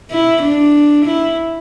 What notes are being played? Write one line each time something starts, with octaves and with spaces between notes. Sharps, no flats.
E4
D4
E4